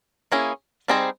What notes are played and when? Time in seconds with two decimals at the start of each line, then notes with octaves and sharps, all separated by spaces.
0.32 A#3 C#4 E4 G#4
0.88 G3 C4 D#4 G#4 C5